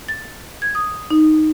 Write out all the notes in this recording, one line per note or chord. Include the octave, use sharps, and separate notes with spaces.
A6
G#6
D#6
D#4